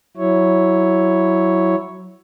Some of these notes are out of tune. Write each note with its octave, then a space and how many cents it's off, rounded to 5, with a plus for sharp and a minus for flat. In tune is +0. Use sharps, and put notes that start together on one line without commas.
F#3 +0 E4 +0 C#5 +0